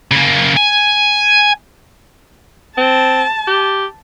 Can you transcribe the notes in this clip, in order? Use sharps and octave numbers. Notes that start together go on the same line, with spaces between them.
C#3 A#3
G#5
C4 A5
G4